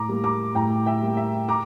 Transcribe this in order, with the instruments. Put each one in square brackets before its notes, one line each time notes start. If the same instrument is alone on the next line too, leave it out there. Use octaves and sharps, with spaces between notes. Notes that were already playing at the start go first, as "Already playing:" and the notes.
Already playing: [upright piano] A2 A#5 D6
G3 A#3
A#5 D6
A2 G5 A#5
E5 G5
G3 A#3
E5
A#5 D6